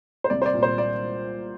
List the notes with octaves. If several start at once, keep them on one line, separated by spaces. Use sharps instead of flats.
C5
C2 D5
C5
D5
A#2
C5
D5